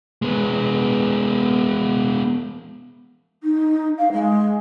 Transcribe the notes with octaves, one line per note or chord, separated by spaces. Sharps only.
G#3 B3
D#4
F5
G#3